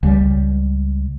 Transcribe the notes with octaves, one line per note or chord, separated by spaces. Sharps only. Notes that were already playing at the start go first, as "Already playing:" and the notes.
C#2 G3